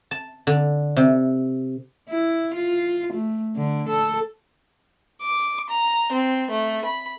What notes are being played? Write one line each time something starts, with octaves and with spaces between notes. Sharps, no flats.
A5
D3
C3
E4
F4
A3
D3
A4
D6
A#5
C4
A3
B5